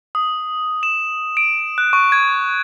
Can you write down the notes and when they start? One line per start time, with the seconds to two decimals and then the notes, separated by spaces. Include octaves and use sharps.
0.15 D#6
0.83 E7
1.37 D7
1.78 F#6
1.93 C#6
2.12 G#6